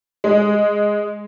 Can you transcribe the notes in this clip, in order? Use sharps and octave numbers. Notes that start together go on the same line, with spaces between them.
G#3